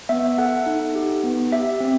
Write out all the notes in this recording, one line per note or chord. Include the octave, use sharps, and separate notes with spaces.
B3 E5
A4 F#5
D#4
G4
B3
G4 E5
C4